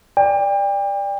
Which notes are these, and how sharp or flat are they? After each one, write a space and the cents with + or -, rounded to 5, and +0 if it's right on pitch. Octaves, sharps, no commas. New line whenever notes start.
D5 +0 G5 +35